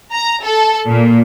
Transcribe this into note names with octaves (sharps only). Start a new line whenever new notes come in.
A#5
A4
A#2